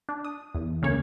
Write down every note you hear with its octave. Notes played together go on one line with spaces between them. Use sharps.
D4
D#6
E2
D2 C#3 A#3 C#4 C#5